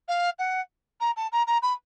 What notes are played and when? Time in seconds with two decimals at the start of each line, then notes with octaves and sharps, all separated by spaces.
0.08 F5
0.39 F#5
1.00 A#5
1.16 A5
1.32 A#5
1.47 A#5
1.62 B5